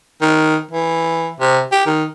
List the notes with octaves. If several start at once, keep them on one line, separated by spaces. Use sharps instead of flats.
D#3
E3
C3
G4
D#3